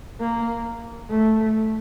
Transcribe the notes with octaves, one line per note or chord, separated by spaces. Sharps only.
A#3
A3